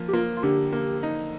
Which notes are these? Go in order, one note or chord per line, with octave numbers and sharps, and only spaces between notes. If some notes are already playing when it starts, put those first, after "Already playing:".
Already playing: F3 A#3
G4
A#3 F4
F4
D3 G4
A#3
D#4